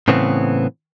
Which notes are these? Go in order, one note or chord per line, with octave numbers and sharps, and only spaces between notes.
A2 C#3 E3 B3 C4